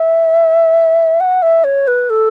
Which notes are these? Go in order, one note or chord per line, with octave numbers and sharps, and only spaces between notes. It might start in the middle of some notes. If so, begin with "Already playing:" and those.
Already playing: E5
F#5
E5
C#5
B4
A4